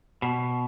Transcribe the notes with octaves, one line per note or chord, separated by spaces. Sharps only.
B2